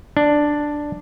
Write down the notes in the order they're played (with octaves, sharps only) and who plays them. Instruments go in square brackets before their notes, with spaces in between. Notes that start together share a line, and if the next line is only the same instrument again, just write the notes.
[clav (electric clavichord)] D4